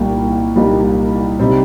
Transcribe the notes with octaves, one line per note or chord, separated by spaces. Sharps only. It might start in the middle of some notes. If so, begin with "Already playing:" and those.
Already playing: C2 A#2 G3 A#3 D#4 G5
C2 A#2 G3 A#3 D#4
C3 G3 C4 D#4